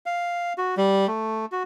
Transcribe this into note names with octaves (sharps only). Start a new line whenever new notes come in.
F5
F#4
G3
A3
F#4